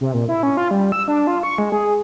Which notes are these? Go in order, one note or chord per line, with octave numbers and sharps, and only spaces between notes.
C3
A#2
E4
C#4
F4
G3
E6
D4
F4
C#6
G#3
G#4